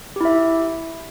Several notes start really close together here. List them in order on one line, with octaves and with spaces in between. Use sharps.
G4 E4 E5